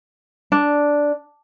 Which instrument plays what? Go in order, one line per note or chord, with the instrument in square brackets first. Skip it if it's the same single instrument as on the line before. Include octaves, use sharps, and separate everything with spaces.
[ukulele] D4